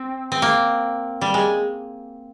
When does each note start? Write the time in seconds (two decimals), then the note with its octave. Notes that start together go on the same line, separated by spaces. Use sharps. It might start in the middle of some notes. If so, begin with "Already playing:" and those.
Already playing: C4
0.32 C4
0.42 A#3
1.21 G3
1.34 G#3